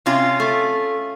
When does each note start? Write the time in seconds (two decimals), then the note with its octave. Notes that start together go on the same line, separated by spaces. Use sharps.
0.06 C3 C#4 F4
0.40 A3